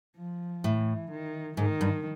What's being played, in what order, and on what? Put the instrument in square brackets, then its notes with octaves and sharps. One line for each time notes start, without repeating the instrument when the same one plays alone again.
[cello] F3
[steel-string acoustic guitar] A2 [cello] E3
[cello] D#3
[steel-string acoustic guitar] G#2 [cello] D#3
[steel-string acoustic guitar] G2